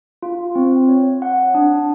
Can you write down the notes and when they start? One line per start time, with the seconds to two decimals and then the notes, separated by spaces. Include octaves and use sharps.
0.22 F4
0.55 C4
0.89 C#5
1.22 F#5
1.54 D4